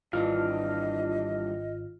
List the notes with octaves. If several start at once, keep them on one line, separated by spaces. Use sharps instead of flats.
G#1 G2 E3 D4 F4 D#5 F6